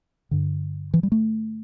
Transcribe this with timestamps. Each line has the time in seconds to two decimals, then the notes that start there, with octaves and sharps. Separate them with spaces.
0.31 G2 D3
0.94 E3
1.03 G3
1.12 A3